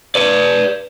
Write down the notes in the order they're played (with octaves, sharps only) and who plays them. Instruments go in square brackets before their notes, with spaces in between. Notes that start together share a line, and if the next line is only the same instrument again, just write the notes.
[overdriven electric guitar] B4 D5